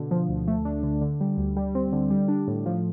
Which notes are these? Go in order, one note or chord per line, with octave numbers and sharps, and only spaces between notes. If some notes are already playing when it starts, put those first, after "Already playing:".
Already playing: B2 D3
F3
D2
A3
D4
D3
D3
G3
D2
G3
C4
D3
G3
D4
A2
F3